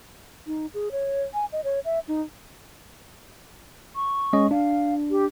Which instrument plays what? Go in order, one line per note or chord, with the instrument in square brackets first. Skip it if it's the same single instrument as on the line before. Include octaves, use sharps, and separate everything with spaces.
[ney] D#4
G#4
C#5
G#5
D#5
C#5
E5
D#4
[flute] C#6
[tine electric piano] G#3 C#4 D#5
[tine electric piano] D4 [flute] F5
[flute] G4